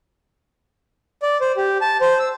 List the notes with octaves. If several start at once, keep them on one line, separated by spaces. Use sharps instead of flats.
D5
C5
G4
A5
C5
E6